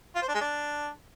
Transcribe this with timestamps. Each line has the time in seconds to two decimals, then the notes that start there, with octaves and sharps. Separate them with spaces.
0.15 F4
0.22 C5
0.28 D4
0.35 G#3
0.41 D4